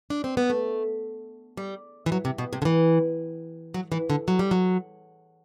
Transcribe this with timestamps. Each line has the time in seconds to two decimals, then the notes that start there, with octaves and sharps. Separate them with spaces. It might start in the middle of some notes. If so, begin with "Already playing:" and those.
0.10 D4
0.24 C4
0.37 B3
0.50 A3
1.57 G3
2.06 E3
2.12 F#3
2.25 C3
2.38 B2
2.53 C3
2.62 D3
2.65 E3
3.74 F#3
3.92 E3
4.10 D3
4.28 F#3
4.39 G3
4.51 F#3